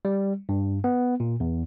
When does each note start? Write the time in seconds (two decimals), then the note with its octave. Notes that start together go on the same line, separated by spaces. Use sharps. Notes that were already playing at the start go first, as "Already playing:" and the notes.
0.05 G3
0.49 G2
0.84 B3
1.20 A#2
1.40 E2